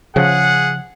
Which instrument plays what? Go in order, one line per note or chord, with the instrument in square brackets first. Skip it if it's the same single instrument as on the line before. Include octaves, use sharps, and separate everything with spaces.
[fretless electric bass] C#3 F3 [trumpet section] G#4 F#5